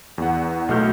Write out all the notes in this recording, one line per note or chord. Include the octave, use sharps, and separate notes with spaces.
E2 F#5
B1 A3 F#4 F6 G6